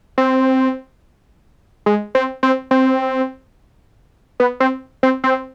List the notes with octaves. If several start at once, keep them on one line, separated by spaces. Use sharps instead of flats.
C4
G#3
C4
C4
C4
B3
C4
C4
C4